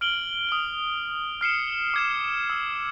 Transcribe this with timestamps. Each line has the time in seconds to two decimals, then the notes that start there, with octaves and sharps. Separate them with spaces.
0.01 F6 D7 F#7 G7
0.49 D#6 F#7
1.41 F6 C7 C#7 E7
1.94 D6 G#6 E7
2.50 E6